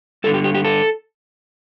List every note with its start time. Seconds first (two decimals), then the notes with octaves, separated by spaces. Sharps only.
0.24 G2 A4
0.27 D3
0.34 G4
0.44 G4
0.54 G4
0.65 A4